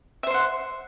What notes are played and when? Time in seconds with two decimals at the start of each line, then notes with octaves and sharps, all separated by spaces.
0.23 E5
0.27 C5
0.31 C6
0.34 F#5